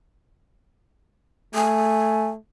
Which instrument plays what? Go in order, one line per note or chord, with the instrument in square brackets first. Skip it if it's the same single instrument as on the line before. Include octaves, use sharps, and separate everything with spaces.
[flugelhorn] A3 [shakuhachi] G#5